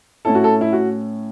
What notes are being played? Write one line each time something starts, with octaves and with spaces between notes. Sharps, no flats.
A2 A3 C#4 E4 A4
F#4
A4
E4
F#4